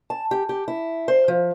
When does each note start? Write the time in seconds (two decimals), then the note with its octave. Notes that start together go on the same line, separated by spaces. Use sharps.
0.10 A5
0.31 G4
0.49 G4
0.68 E4
1.08 C5
1.28 F3